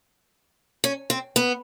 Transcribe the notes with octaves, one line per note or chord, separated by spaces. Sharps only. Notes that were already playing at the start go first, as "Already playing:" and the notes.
C#4
C4
B3